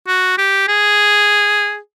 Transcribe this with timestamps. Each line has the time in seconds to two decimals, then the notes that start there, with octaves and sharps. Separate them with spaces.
0.07 F#4
0.38 G4
0.68 G#4